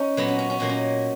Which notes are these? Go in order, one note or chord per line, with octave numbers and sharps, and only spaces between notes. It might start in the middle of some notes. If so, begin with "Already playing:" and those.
Already playing: C#4 D#4
A#2 F#3 A#3 B3
C#4
C#4
C#4
A#2 F#3 A#3 D#4
C#4